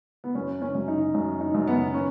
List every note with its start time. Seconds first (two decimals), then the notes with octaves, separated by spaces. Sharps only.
0.24 B3
0.35 F#2 C#4
0.62 C#4
0.75 F#2
0.88 D#4
1.14 F#2
1.40 D#4
1.54 F#2
1.67 B3
1.94 C#4